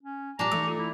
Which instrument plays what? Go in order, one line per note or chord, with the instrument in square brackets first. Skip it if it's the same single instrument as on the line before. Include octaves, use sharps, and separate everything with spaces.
[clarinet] C#4
[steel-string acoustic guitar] A#2 G3 [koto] D4 A5 [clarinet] A#5
[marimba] E3 D#4 [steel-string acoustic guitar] A3
[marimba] F4 A4 D6
[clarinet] E4